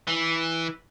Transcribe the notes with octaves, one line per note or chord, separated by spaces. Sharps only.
E3